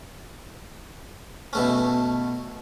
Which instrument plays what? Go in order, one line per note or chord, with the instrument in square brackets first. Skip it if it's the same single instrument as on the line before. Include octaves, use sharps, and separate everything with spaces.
[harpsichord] B2 A3 C#4